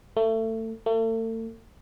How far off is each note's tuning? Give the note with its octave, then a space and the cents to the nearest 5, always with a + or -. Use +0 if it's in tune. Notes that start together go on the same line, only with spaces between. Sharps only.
A3 +25
A3 +40